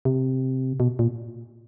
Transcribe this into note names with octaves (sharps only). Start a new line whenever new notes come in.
C3
B2
A#2